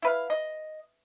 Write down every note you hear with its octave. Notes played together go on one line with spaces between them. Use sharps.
E4 B4 F5
D#5